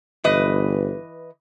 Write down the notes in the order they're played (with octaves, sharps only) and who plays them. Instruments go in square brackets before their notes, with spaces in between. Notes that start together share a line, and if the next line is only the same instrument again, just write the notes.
[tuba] G1 [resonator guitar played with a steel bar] E3 B4 D#5